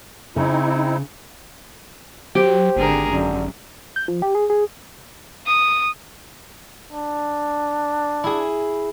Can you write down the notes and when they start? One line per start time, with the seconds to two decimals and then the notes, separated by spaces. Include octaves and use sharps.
0.36 C#3 C4 D#4 E4
2.35 F#3 G4 C5
2.76 G#1 D3 G#4 A#4
3.10 F#2 D3
3.96 G6
4.08 F3
4.22 G4
4.35 G#4
4.50 G#4
5.46 D#6
6.92 D4
8.24 E4 G#4